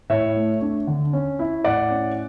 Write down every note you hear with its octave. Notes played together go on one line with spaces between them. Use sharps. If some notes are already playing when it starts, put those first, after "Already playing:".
A2 C#5 E5
A3
D4
D3
C#4
E4
A2 D5 F#5
C#4